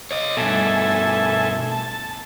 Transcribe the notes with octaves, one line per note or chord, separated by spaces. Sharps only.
C#5 D#5
G2 B2 A4 E5 G#5
A5